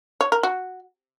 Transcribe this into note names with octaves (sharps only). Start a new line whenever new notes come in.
C#5
A#4
F#4